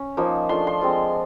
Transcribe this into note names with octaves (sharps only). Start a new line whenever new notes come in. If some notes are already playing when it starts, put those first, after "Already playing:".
Already playing: C#4
F3 A#3 D#4
A3 D4 F4 C6
C6
G#3 C4 F4